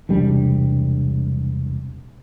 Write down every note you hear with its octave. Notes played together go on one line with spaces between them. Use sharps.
E1 C2 G3 D4